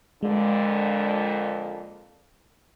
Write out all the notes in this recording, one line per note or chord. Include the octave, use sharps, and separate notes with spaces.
F2 A#2 D3 G#3